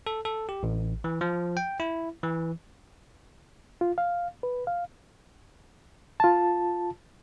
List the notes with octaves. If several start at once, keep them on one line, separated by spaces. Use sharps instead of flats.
A4
A4
G4
A1
E3
F3
G5
E4
E3
F4
F5
B4
F5
F4 A5